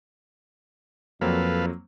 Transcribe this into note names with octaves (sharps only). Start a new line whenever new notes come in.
F2 F#3 A#3 C4 A4 B4 F5